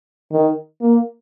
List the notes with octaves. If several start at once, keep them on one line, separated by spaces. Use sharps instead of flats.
D#3
A#3